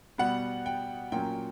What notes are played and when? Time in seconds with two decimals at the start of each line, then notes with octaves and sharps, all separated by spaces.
0.18 B2 G3 B3 F#5
0.66 G5
1.12 A#2 F#3 A#3 C#4 G5